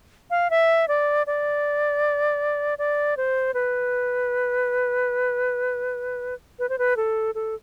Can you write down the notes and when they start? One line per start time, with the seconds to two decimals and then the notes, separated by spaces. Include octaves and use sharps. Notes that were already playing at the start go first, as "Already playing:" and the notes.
0.30 F5
0.50 E5
0.88 D5
1.27 D5
2.78 D5
3.17 C5
3.54 B4
6.59 B4
6.69 C5
6.78 B4
6.96 A4
7.35 A4